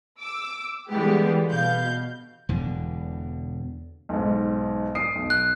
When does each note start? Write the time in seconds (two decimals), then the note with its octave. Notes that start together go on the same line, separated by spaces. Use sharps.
0.21 D6 E6
0.90 D3 E3 G3 G#3 B3 G4
1.49 B2 F5 G6
2.49 E1 E2 B2 D3
4.09 B1 G#2
4.95 D#6 C7 D7
5.15 B1
5.30 F#6